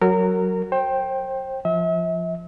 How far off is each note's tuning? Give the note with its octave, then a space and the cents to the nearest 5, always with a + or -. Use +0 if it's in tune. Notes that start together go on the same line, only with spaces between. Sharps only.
F#3 +5 A#4 -20
C5 +30 G5 +0
F3 +0 E5 -40